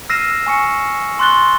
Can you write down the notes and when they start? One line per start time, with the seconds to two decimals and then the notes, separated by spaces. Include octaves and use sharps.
0.10 E6 F6 A#6 C7 D#7 E7
0.46 G#5 C#6 C#7
1.19 C6 C#6 F#6 A6 G7